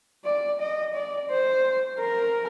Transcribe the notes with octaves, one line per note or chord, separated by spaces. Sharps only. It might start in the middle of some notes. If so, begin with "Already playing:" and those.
D5
D#5
D5
C5
A#4